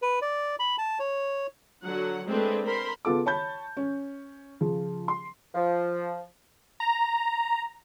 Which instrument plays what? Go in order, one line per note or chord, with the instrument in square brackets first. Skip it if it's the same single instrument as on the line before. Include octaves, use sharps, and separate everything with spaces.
[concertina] B4
D5
B5
A5
C#5
[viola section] D3 F#3 F#5
G#3 A3 C4 D4 B4
A#4 C5 B5 C6
[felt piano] C#3 B3 F4 A4 D6
C#5 A5 B5 G6
C#4
C#3 F3
C6
[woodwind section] F3
[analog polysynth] A#5